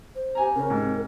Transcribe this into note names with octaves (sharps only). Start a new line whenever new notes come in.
C5
G4 G#5 A#5
C#3 C#4 A#4
G#2 C3